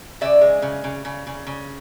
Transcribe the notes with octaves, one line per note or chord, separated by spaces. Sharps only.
C#3 D5 E5
G#3
C#3
C#3
C#3
C#3
C#3